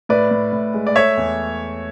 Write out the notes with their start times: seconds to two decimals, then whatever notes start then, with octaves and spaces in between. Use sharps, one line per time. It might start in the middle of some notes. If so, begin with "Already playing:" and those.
0.09 A2 B4 D5
0.31 A2
0.52 A2
0.74 G#3
0.87 D5
0.96 A3 C#5 E5
1.17 E2